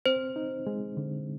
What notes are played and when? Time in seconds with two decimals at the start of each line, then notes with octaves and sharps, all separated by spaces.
0.06 C4 C5
0.36 D#4
0.67 G#3
0.97 D3